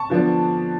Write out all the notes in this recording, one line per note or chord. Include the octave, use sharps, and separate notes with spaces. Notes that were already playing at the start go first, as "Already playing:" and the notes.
Already playing: A5 C#6
D3 F3 B3 D4